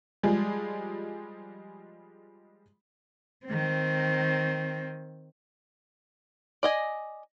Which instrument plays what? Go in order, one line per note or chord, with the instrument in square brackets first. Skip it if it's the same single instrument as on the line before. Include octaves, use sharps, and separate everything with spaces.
[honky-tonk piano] F3 G3 G#3 G#4
[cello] D#3 C4
[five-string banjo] D5 D#5 G#5